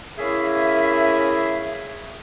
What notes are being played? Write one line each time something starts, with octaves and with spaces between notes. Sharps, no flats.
A#3 C#4 E4 G#4 E5